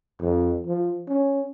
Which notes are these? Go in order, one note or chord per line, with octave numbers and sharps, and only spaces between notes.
F2
F3
C#4